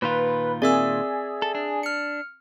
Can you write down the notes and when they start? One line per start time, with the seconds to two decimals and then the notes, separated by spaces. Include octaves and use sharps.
0.02 A#2 D#3 F4 B4
0.62 C4 G#4 A#4 D5 E5 E6
1.42 A4
1.55 D4
1.83 F6 C#7